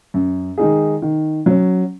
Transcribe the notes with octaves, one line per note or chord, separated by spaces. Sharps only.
F#2
D#3 G#3 D#4 G#4
D#3
F#3 C#4